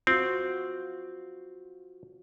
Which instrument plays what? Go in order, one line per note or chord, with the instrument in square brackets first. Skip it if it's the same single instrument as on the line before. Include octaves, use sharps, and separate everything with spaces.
[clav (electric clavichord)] C4 [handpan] F4 F#4